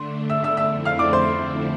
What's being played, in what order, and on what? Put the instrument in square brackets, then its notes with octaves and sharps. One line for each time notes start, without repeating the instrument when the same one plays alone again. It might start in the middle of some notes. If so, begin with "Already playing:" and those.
Already playing: [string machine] D3 A3 D4 [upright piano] C6
[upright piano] E5 E6
E5 E6
E5 E6
[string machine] F2 D3 A3 C4 E4
[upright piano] F5 F6
D5 D6
C5 C6